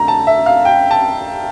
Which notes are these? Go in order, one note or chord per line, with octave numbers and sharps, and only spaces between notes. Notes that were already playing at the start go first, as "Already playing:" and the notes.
Already playing: F2 D3 A3 C4 A#5
A5
E5
F5
G5
A5